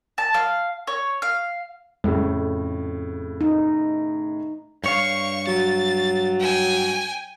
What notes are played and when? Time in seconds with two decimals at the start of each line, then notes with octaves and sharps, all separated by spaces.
0.18 A5
0.34 F5
0.87 C#5
1.22 F5
2.04 F2 A2 C#3
3.41 D#4
4.84 G2 C#5 F5 C#6
5.47 F#3 A6
6.40 G5 G#5